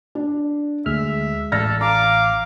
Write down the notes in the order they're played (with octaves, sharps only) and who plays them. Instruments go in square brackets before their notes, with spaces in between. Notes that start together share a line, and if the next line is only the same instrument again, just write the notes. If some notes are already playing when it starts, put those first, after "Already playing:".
[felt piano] D4
[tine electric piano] D2 F6 [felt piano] G#3 [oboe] E5
[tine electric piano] A1 [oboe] A4 [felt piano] D5 F6 A#6
[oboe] F5 [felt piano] A#5 [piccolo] D6